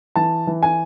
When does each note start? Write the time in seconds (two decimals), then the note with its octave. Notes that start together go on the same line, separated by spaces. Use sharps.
0.16 E3 A5
0.47 E3
0.63 G#5